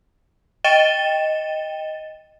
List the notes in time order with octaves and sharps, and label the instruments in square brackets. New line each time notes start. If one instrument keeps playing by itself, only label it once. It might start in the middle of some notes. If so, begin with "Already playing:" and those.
[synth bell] D#5 G5 A6 D#7 E7 G7